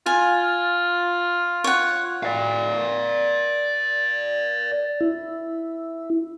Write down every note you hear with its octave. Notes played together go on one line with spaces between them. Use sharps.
F4 G#5
C#5 F#5
D5 F5
E4